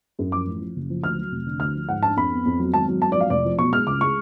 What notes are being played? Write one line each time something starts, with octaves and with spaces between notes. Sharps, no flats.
F#2
F3 D6
A1
F3
F#1
F3
D2 F6
F#3
F1
D3
D2 F6
F3
G#2 F#5
D4 A5
F2 B5
B3
F2
F#3
G#1 A5
F#3
G#1 A5
D5
F3 F5
F1 D5
F3
B1 C#6
G#3 F6
C#2 D6
G#3 C#6